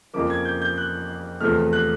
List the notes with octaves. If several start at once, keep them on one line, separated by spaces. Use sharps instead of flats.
F2 C#3 F3 A#3 D6
G#6
G6
G6
F#6
E2 C3 F3 A3 F6
F#6